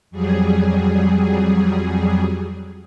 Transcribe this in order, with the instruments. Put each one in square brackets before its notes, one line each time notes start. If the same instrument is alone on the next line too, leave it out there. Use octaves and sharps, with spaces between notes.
[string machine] F2 F#3 G3 G#4